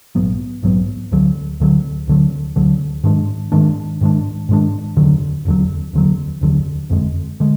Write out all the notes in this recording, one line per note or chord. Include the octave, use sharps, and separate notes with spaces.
A#1 G#2 F#3 B3
A#1 G#2 F#3 B3
D2 D3 F#3
D2 D3 F#3
D2 D3 F#3
D2 D3 F#3
G#2 D#3 G#3 D4
G#2 D#3 G#3 D4
G#2 D#3 G#3 D4
G#2 D#3 G#3 D4
F1 D#2 D3 F#3
F1 D#2 D3 F#3
F1 D#2 D3 F#3
F1 D#2 D3 F#3
F#1 F2 D3 G#3
D3 G#3